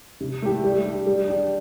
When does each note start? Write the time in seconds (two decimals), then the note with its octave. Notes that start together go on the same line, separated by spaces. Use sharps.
0.21 C3
0.42 A3 E4 G4
0.64 G3
0.85 D4 G4
1.07 G3
1.28 D4 G4